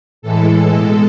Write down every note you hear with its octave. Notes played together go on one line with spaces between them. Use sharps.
A2 E3 G#3 A4
B2 G#3